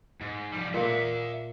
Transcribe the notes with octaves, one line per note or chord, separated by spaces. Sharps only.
G#2
F3 G3
A#2 A#3 E5 F#5